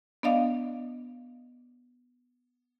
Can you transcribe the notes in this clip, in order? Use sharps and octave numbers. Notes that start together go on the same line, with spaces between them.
B3 D4 D5 D#5 F5